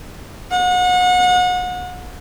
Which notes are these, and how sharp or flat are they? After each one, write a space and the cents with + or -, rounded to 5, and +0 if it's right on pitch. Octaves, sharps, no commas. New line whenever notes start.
F#5 -35